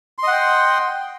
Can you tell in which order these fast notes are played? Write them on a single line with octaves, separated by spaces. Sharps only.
C6 D#5 F#5 G5